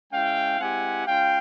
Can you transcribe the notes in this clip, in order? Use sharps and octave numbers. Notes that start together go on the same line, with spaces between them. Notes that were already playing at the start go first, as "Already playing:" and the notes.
G#3 C#4 E4 F5 G5
G#3 C4 E4 G4 F#5 G#5
G#3 C#4 F4 F5 G5